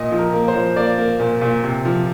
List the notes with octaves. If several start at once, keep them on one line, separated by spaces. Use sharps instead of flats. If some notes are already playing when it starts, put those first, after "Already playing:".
Already playing: A#2 D#5
F3
A#4
A#3
C5
F3
A#3 D5
A#3
A#2
A#2
C3
F3